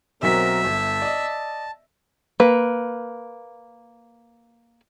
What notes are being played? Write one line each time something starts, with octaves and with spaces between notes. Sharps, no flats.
B1 F#3 C4 A#4 E5 B6
G1 A5
D5 D#5
A#3 B4